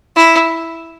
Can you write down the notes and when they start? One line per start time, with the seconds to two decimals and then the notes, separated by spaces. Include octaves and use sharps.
0.17 E4